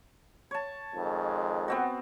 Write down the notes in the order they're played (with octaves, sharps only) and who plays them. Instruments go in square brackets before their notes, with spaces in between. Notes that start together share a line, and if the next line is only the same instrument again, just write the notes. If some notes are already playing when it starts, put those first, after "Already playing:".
[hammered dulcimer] C#5 A5
[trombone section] F2 D#3 G#3
[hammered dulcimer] B3 C4 F#4